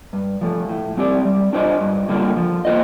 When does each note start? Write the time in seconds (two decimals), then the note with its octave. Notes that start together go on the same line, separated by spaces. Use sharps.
0.13 G2
0.41 F3 A3
0.69 A2
0.97 G3 C4 G4 D5
1.25 G3
1.53 D4 F4 C5 D#5
1.81 G2
2.09 D3 G3 A#3 F4
2.37 F3
2.65 A#3 F4 C5 D#5